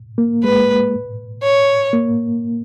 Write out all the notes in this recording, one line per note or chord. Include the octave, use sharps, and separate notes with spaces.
A#3
G#3 B4
C#5
A#3